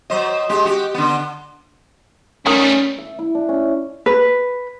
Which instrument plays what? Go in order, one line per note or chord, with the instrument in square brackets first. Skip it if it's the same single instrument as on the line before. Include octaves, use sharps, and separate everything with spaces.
[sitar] F#3 C5 D#5
G#3 G4
F#4 G4
D3 B3
[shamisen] D#3 F#3 [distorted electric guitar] G3 A3 [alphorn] C#4
[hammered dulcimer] E5
E4
D4
C#4
[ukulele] B4